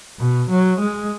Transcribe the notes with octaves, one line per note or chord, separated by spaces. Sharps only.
B2
F#3
G#3